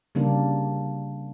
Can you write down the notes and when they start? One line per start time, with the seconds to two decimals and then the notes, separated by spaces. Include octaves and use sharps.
0.15 C#3 G3 A#3 D4